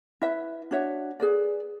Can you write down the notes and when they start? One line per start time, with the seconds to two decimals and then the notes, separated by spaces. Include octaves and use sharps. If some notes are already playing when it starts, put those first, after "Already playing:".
0.22 E4 B4 E5
0.71 D4 F#4 C#5 E5
1.20 G#4 B4 D5